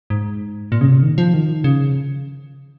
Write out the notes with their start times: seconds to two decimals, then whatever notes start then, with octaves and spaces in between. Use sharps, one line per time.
0.10 G#2
0.72 A#2
0.81 C#3
0.87 C3
0.98 C#3
1.03 D#3
1.18 F3
1.34 D#3
1.64 C#3